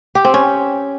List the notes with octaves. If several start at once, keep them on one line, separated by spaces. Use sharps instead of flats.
G4
C4
C#4